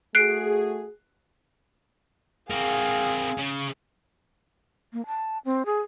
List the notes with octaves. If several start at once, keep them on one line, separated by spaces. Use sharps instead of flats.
A3 F#4 G#4 F#6 C7 D7
C4 G#4 A#4 F5
C#3
A#3
A5
C4
G#4